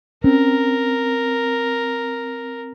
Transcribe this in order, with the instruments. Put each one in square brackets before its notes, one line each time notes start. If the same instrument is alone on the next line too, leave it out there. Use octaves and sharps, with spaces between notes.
[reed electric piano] C4 [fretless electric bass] C#4 [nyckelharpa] A#4